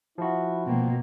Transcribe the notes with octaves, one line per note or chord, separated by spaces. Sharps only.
F3 E4 F#4
B2 A#3 C4